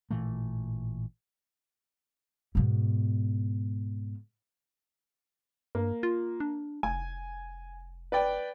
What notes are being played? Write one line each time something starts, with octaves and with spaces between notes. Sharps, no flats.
A1 A#2 E3 A3
G#2 B2
G2 A#3
F4
D4
F1 G#5
B4 D5 G5